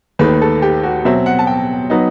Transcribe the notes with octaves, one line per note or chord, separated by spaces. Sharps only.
D#2 D#3 A3 B4
A4
G4
F#4
B2 F#3 C4 E5
F#5
A5
G5
F#3 B3 D#4